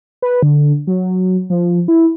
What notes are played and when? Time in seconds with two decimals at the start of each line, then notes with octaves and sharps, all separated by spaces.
0.22 B4
0.43 D3
0.87 F#3
1.50 F3
1.88 E4